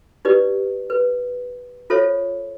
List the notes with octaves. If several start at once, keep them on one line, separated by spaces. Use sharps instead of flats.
D#4 G4 B4 D5
B4
F4 A4 C5 C#5 E5